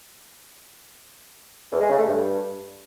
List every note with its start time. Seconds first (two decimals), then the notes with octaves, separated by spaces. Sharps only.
1.72 E2
1.81 G#3
1.90 C#3
1.98 A3
2.07 G2